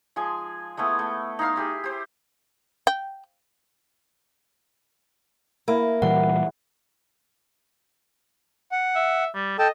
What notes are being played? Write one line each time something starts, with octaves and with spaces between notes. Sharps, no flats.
F3 G#3 G#5
G#3 A3 B3 E4
A3
D#4 E4 F5 C6
E4 G4 G#4
G4 C5
G5
A#3 E4
A#2 E3 G3 F#5
F#5
E5
G3
A4 D#5 G5 A5